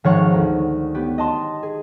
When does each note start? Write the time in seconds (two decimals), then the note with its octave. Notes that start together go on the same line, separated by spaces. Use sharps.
0.04 G#1 F3 C#5 F#5 C#6
0.32 D2 D#4
0.95 B3 G4
1.18 D#5 A5 C6
1.63 G#4